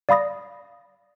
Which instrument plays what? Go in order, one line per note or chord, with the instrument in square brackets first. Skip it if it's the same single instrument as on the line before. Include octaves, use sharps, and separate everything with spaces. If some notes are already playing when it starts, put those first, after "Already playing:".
[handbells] D5 F5 B5 D#6 A#6